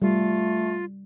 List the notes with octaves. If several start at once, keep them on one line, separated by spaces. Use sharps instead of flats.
G3 A3 F4